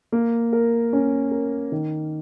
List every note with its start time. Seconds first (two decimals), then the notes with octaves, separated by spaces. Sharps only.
0.12 A#3
0.53 A#4
0.93 C#4
1.31 A#4
1.72 D#3